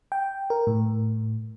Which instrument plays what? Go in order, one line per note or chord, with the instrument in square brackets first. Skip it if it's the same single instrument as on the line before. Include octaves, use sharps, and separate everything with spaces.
[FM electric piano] G5
A#4
A2